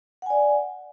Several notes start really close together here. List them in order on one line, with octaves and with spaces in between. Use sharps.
F#5 G#5 D5